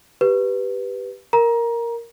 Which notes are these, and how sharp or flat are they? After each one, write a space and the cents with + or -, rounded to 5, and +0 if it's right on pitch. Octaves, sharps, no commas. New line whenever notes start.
G4 +0 B4 +0
A#4 +0 A#5 +20